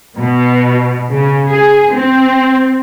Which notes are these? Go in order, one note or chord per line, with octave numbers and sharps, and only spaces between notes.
B2
C#3
G#4
C4